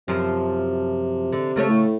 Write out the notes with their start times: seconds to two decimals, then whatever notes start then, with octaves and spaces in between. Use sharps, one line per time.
0.08 F#2 C3 F3
1.32 D3
1.56 C#3 A3 C#5
1.70 A2